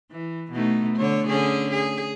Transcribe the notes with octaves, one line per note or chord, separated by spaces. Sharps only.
E3
B2 A3 D#4
D3 C#5
D3 C#4 G#4
G#4